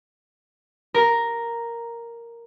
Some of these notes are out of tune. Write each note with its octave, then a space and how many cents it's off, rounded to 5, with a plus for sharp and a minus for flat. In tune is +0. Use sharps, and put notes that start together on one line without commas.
A#4 +0